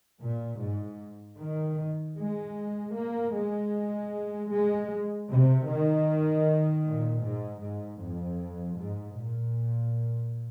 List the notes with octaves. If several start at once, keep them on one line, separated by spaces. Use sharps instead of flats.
A#2
G#2
D#3
G#3
A#3
G#3
G#3
C3
D#3
A#2
G#2
G#2
F2
G#2
A#2